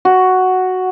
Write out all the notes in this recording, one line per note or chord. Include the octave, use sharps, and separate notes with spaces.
F#4